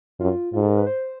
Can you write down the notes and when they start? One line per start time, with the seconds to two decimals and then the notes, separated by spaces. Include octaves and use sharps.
0.20 F#2 F4
0.53 G#2 F4
0.62 A4
0.70 A#4
0.78 B4
0.87 C5